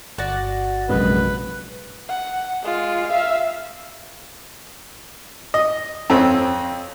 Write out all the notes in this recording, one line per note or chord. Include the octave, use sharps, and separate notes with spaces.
G1 F#4 D5 F#5 A6 A#6
A#1 F#2 C3 G#3 B4 D#5
F#5
G#3 F4
E5 F5
D#5
F2 C4 C#4